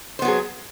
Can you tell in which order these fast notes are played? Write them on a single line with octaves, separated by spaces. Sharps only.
C5 B3 F#3 G#4